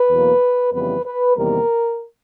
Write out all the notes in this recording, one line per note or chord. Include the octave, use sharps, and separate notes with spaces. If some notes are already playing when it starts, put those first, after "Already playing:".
Already playing: B4
E2 B2 F#3 A#3
F2 C#3 E3 G3 B3 B4
B4
E2 C3 D#3 G3 A#3 A#4